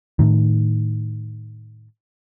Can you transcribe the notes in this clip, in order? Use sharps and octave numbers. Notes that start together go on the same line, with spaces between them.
A2 D#3